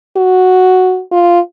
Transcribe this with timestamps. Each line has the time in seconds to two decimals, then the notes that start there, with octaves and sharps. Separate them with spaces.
0.17 F#4
1.12 F4